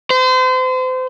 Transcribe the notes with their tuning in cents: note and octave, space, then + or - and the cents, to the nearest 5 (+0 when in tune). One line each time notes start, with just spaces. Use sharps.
C5 -35